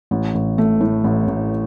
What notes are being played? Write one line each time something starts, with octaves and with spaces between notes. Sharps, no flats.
A1
A1
A3
A2
A1
A1